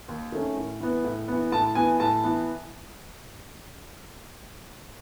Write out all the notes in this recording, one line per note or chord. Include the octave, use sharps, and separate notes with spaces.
D#2
D#3 A3 C#4
A2
E3 B3
A2
E3 B3
A2 A5
E3 B3 G#5
A2 A5
E3 B3